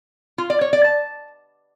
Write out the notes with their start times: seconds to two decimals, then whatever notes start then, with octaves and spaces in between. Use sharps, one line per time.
0.38 F4
0.50 D5
0.61 C#5
0.73 D5
0.84 A5